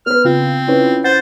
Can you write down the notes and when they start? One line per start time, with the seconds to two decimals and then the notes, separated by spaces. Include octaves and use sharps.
0.06 B3 B4 F6
0.25 C#3 C4 F4
0.67 C#4 E4 B4
1.04 C5 F#5 A6